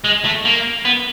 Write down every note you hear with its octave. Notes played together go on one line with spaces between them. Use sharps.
G#3
A3
A#3
B3